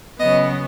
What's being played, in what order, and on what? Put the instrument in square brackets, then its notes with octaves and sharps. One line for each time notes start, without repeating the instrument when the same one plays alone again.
[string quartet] C#3 F#3 B3 D#5